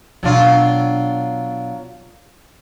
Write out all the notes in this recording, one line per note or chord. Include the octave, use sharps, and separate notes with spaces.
B2 F#3 D4 F4